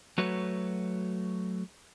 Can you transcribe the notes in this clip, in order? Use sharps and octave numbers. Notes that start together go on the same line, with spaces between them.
F#3 A3 F#4 B4 C#5